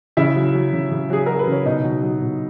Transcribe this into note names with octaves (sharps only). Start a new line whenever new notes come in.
C#3 E4 E5
F#3
F#3
C#3
C#3
F#3 G#4
F#3 A#4
B4
C#3
C#5
B2 D#4 D#5
F#3
F#3
B2